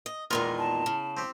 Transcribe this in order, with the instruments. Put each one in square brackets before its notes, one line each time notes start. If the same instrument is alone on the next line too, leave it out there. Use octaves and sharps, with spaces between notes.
[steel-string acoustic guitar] D#5
[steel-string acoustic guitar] E2 A#2 D#3 [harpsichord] G#3 F4 A#4
[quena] A5
[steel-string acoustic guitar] C#3
[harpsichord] C4 G4